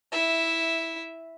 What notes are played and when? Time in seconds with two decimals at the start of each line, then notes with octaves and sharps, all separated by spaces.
0.12 E4 E5